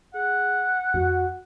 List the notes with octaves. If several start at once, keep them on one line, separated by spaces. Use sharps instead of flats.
G#4 F#5
F2 F#4